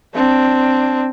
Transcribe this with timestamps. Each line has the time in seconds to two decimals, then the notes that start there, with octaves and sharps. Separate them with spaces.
0.15 C4 D4